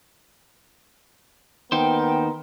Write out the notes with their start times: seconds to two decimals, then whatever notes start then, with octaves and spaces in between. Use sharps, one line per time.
1.72 D#2 B3 D#4 A#4 C5 G5